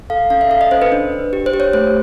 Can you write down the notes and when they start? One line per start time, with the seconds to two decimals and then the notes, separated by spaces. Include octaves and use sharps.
0.10 A4 F5
0.30 C#4 F5
0.41 E5
0.51 A4 F5
0.61 D#5
0.71 C#4 C5
0.82 B4
0.92 D4
1.12 D4
1.33 G4
1.46 C5
1.53 G4
1.60 C#5
1.73 A3 C5